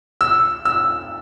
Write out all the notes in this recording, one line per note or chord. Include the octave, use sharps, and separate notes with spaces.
E6
E6